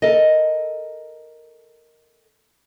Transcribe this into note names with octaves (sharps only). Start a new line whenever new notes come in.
A4 A#4 D#5